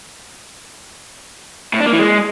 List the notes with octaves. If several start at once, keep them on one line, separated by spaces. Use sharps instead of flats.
A2
D4
A#3
E3
G#3